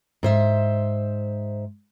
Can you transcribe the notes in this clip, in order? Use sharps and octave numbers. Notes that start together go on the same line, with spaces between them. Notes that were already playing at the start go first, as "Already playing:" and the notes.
G#2 C5 E5